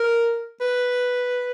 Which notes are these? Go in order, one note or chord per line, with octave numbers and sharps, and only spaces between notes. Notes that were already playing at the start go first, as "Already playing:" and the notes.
Already playing: A#4
B4